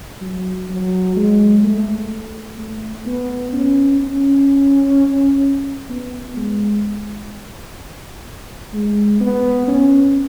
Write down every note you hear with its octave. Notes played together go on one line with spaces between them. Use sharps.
F#3
F#3
G#3
A3
A3
B3
C#4
C#4
B3
G#3
G#3
B3
C#4